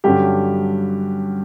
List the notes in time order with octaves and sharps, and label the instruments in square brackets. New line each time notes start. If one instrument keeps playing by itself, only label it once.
[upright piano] G2 D3 F#3 C#4 G4